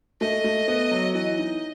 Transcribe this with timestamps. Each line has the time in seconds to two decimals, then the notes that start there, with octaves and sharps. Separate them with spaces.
0.21 A3 D#5
0.44 A3
0.68 B3
0.91 F#3
1.15 E3 D#5
1.38 D#4